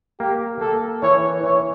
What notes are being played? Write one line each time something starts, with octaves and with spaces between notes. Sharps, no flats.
A#3 G4
A#3 A4
E3 C#5
E3 C#5